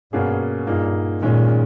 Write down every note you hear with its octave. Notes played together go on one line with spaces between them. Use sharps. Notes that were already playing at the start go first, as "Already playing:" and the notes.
G2 B2 A#3 C#4 G#4
G2 A#2 A#3 D#4 G#4
A#2 D#3 G#3 C#4